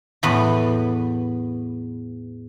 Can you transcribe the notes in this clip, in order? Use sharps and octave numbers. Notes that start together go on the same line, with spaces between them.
E2 A2 B3 B4